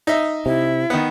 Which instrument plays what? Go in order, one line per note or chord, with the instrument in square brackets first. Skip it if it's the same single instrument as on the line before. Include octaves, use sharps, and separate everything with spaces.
[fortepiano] D#4 D#5 E5
[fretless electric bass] C3 [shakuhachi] E4
[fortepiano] D#3 B3